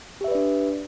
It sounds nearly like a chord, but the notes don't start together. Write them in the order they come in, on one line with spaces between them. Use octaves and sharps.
G4 E5 B4 D5 D4